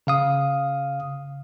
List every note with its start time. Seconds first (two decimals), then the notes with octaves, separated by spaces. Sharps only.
0.07 C#3 F5 D#6